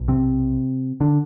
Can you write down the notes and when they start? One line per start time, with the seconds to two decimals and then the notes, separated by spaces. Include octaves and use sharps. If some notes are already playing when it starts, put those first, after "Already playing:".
Already playing: B1 B2
0.08 C3 C4
1.00 D3 D4